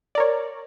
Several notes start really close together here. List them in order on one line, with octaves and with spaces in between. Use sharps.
D5 A#4 C#5